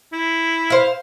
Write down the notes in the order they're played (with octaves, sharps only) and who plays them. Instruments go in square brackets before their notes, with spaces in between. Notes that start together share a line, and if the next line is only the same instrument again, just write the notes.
[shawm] E4
[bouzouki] C5 F5